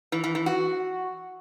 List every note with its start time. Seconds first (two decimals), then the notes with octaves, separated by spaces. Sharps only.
0.12 E3
0.24 E3
0.35 E3
0.46 F#4